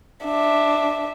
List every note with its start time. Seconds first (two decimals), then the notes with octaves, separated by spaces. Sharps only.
0.24 D4 E5